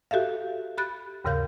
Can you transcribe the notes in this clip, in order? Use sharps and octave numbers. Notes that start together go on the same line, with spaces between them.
F#4 G4 A4 E5 F5
G4 B5 F#6 A6
D#2 G#2 C#3 A#4 F5 G6